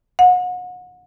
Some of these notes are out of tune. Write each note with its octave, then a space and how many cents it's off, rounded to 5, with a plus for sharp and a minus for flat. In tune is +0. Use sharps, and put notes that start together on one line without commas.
F#5 -35